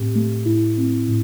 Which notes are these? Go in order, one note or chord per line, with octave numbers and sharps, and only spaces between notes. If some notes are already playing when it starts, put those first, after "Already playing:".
Already playing: A2 C4 G4
A3
A2 E4
C4
A2